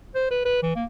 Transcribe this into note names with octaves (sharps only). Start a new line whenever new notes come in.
C5
B4
B4
E3
A#3